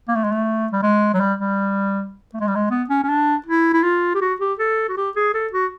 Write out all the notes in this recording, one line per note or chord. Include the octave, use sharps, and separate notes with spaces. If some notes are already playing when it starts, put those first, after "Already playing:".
A#3
A3
G#3
A3
G3
G#3
F#3
G3
G3
A3
G#3
G3
G#3
B3
C#4
C#4
D4
E4
E4
F4
G4
F#4
G4
A4
F#4
G4
G#4
A4
F#4